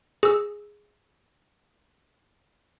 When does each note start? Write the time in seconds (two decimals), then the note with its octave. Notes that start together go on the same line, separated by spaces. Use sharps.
0.23 G#4 E6